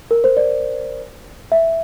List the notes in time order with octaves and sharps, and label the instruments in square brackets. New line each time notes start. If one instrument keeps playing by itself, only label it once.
[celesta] A#4
C5
D5
E5